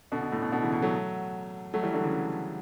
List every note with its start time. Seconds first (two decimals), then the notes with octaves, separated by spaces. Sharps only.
0.12 B2 D3
0.22 B2
0.32 A2
0.42 B2
0.52 B2 D3
0.62 C#3 E3
0.73 B2
0.82 F#3 A3
1.74 F#3 A3
1.83 E3 G3
1.93 D3 F#3
2.04 C#3 E3